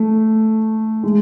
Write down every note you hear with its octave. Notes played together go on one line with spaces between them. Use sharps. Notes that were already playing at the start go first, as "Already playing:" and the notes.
Already playing: A3
G#3